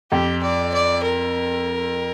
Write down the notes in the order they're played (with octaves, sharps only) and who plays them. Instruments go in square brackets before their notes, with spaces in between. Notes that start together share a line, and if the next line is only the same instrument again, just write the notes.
[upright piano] F2 [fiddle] G4
[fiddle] D5
D5
A#4